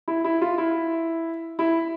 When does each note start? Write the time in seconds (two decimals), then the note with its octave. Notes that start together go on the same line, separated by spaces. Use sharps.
0.08 E4
0.24 E4
0.42 F4
0.58 E4
1.59 E4